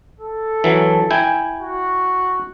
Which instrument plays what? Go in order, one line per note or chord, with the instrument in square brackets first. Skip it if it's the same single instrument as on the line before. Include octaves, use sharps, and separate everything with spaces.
[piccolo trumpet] A4
[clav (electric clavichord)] E3 F#3
E4 G5 G#5
[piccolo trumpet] F#4